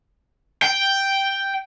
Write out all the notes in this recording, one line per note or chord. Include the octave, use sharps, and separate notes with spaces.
G5